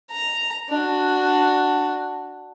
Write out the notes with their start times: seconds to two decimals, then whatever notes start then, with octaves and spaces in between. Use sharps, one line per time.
0.11 A#5
0.69 D4 F#4